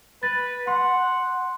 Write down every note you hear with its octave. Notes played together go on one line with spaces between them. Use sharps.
B4 A6
F#5 C6